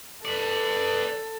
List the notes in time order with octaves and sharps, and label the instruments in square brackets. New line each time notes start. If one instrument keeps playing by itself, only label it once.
[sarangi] A4 [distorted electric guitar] B4 D5